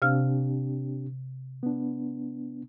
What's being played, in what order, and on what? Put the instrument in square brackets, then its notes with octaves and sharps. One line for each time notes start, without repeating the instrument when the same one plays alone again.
[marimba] C3 F5 F6 [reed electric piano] C4 D4 G4
[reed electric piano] B3 D4